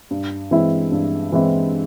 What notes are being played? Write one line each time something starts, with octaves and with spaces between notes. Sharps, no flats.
G2
E3 G#3 C4 E4
G2
E3 G#3 C4 E4